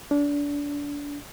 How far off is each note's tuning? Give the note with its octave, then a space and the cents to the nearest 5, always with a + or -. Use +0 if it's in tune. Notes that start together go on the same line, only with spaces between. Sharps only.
D4 -25